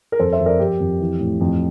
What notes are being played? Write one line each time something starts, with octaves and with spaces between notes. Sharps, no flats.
A#4
F2 A4 C5
C5 E5
F2
A#4 D5
F2 G4
F2
E3
A2
F2